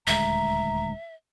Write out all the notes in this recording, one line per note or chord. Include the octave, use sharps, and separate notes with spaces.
D#1 D2 G#3 E5 A#5